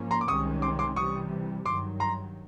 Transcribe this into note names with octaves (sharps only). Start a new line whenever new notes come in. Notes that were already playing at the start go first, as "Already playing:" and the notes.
Already playing: G#2 F3 A#3 C#4
A#5 C6
D6
C2 C3 D#3 G#3 C#4 C#6 D#6
C6 D6
C6 D6
C3 E3 G3 C#6 D#6
G2 D#3 F#3 C6 D6
A#5 C6